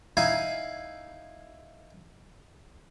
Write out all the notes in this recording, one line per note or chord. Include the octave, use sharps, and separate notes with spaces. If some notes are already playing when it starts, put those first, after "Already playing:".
D#4 E4 F5 G#5 A#5